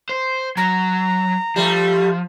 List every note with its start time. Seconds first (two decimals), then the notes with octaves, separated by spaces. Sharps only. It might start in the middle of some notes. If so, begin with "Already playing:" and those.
0.09 C5
0.57 F#3 A#5
1.56 F3 G3 A3